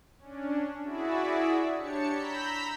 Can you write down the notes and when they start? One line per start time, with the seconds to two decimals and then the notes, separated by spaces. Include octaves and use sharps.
0.19 C#4 D4
0.84 E4 F#4 G#4 D5 E5
1.78 D4 G4 C#5 A5 C#7
2.12 A#5 B5 E6 G6 B6